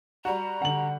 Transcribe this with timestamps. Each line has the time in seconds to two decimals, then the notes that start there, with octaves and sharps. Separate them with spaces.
0.25 G3 F#4 A#5
0.62 D3 F#5 F#7